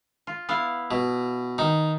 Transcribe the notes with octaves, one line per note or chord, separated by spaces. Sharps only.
F4
B3 E4 F5
B2
D#3 D#4